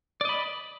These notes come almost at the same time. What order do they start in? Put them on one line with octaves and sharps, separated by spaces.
D5 D#5 B5